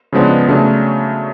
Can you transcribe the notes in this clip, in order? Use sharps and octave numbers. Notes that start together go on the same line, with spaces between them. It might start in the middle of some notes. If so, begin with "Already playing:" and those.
C#3 F3 G#3 B3 D4
C#3 F#3 A3 D4